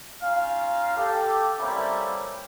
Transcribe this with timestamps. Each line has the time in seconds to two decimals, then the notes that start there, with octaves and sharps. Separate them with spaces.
0.22 C#4 D#4 F4 F5
0.97 G4 A4
1.59 G3 A3 A#3 C4 C#4 E4